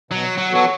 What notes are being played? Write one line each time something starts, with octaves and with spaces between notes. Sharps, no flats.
B2 F#3
F#3
F#3 B3 F#4 A4 C#5